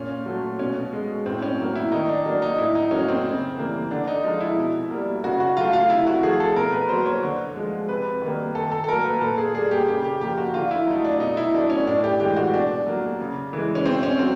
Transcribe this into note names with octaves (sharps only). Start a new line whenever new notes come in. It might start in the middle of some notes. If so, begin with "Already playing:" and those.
Already playing: A#2 C#4
F#3 A3
B2 C#4
G#3
A2 C4
C#4
F#3 A#3
E4
D#3 D#4
D4
F#3 A#3 D4
D#4
A2 E4
D#4
F#3 A#3 C#4
C4
C#3
E3 G3 A#3
D3 D4
D#4
F3 G#3 D#4
E4
B2
G3 A#3
C#3 F#4
F#4
F#3 A3 F4
F4
C3 E4
F#4
F3 A3 G#4
A4
B2 A#4
B4
F#3 A#3 C5
C#5
D3
F3 G#3
C3 B4
D#3 G3 A#3
D#3 A4
A4
A4
F#3 A#3 A#4
B4
A#2 A4
G#4
G3 A#3 G#4
G4
C#3 G4
G4
F3 A#3 G4
F#4
D3 F4
E4
F#3 A3 D#4
D4
B2 D#4
E4
F#3 A3 D4
C#4
A2 D4
G4
E3 G#3 G4
F#4
B2 D4
F#3 A#3
C#3
E3 G#3
C#4
B2 C4
C#4
F#3 C4